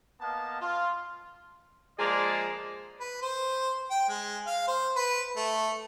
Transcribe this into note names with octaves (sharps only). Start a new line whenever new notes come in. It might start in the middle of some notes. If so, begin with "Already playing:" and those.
A#3 B3 D#5 F5 A5
F4
F3 G#3 A#3 G#4 D5
B4
C5
G5
G#3
F5
C5
B4
A3